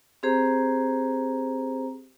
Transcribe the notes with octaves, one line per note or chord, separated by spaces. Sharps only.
C4 G4 G#4 C5 A#5